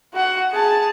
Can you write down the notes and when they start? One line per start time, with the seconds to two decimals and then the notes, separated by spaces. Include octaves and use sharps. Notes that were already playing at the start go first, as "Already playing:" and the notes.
0.14 F#4 F#5
0.52 G#4 A5